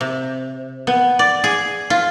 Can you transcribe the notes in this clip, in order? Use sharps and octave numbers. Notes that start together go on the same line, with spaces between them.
C3
B3
D5
G#4
F4